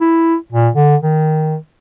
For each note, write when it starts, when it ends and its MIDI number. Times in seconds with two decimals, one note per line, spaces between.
0.01 0.36 64
0.52 0.69 46
0.75 0.96 50
1.03 1.56 51